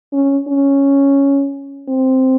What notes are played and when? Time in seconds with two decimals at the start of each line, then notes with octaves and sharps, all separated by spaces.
0.13 C#4
0.48 C#4
1.89 C4